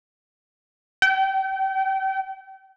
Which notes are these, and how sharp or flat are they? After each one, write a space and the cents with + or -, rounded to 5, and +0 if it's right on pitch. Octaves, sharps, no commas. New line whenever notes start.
G5 -35